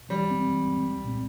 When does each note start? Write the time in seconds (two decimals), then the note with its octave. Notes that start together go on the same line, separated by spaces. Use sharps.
0.09 E3 G3
0.28 G#3 C4
0.47 E3
0.65 G#3 C4
0.85 C2
1.04 A#2 G#3 C4